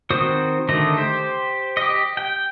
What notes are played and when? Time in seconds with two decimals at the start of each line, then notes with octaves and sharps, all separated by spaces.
0.10 D#3 C4 F#4 C5 D#6
0.68 D3 D#3 A3 D#5
0.97 G4 C5
1.77 G4 D#5
2.17 G5